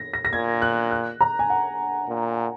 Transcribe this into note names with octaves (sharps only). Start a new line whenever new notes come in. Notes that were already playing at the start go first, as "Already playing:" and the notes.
Already playing: A#6
A#6
A#6
A#2 G#6
F#6
F#6
A#5
G#5
F#5
A#2